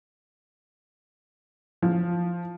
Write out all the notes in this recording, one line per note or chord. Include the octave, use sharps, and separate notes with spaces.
F3